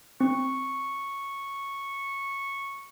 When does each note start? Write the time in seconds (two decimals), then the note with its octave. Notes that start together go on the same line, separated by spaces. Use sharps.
0.21 C4 C#6